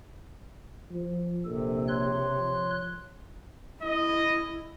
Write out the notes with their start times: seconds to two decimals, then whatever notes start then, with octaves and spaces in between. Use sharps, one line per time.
0.91 F3
1.45 A#1 C3 A4
1.88 C#5 C6 F#6
2.37 F3
3.82 E4 D#5